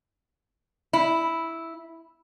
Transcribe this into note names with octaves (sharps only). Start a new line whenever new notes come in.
E4